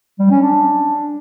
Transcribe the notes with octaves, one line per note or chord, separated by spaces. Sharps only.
G3
C#4
D4